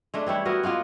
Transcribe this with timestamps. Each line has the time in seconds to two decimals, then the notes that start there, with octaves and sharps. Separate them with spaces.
0.14 G#3 A3 D4
0.26 E3 G3 E4 C#5
0.45 B3 E4 F#4 A#4
0.63 G#3 A#3 B3 F4